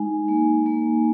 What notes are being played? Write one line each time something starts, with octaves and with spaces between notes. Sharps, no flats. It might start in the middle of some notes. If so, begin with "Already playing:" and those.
Already playing: G#3 D#4 G#5
A#3
A#3